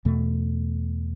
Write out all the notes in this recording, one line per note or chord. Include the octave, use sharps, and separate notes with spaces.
E2 B2 A3